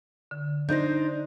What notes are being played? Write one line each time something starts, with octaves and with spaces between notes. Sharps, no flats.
D3
D4 D#4 C5 G6 A#6